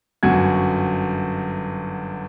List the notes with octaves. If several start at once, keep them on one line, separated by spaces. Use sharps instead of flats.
G1 F#2 F#4 G#6